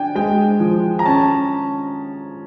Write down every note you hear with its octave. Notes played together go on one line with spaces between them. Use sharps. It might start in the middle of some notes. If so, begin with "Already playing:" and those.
Already playing: D4 G5 G#5
G#3 G5
F3
A#5
C#4 A5